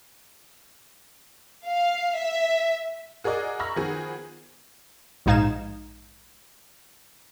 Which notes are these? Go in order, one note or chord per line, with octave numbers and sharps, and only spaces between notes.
F5
E5
F#4 G#4 A#4 D5 D#5
A#5 B5 C#6 E6 F6 A#6
D#3 F3 B3 F#4 G#4
A#1 G#2 D#4 F5 G#6 E7